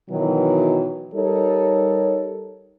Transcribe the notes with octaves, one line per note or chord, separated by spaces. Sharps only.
B2 D#3 E3 F#3
G3 D#4 A4 A#4 C#5